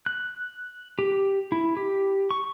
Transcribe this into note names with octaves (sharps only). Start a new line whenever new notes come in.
F#6
G4
E4
G4
C#6